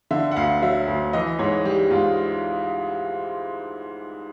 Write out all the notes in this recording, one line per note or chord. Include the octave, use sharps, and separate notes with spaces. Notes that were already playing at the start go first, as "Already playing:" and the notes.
D3 E5
F#5
D2 F5
F#3 E5
D2
E3 D#5
G#2 C#5
G3 G4
G#2 F4